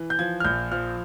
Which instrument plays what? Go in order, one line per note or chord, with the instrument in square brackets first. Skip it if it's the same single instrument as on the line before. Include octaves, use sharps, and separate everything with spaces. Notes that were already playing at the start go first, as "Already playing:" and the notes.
Already playing: [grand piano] E3
G6
F3 G#6
F6
A#1 G6
F3 F6